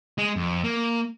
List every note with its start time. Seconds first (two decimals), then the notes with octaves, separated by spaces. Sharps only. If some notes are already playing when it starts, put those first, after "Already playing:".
0.18 G#3
0.36 F2
0.64 A#3